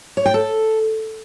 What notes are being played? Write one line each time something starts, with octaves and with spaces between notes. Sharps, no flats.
C#5
G5
A4